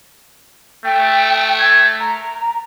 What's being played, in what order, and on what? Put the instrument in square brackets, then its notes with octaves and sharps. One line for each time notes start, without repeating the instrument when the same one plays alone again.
[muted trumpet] A3 [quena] G5
[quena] G#6
A#5